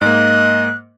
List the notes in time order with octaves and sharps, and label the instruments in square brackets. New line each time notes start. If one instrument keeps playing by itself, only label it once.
[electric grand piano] G#2 A#3 [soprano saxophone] D#5 [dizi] F#6